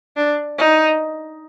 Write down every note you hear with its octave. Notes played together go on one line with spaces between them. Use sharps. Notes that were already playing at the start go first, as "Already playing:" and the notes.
D4
D#4